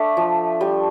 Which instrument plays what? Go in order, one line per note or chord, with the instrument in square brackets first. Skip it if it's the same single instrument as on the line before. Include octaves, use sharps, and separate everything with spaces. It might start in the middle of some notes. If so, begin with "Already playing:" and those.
Already playing: [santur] A3 D4 [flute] E5
[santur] F3
G3